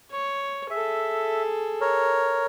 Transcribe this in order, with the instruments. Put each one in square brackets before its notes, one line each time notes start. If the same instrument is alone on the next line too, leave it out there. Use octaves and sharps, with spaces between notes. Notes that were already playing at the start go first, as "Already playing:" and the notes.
[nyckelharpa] C#5
[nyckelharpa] G#4 A4 [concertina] E5
[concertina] A#4 C#5